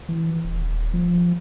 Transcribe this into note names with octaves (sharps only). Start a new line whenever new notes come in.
E3
D#1
F3